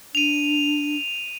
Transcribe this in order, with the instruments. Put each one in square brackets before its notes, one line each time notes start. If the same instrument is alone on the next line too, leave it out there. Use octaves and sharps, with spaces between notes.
[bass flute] D4 [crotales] D#7 F7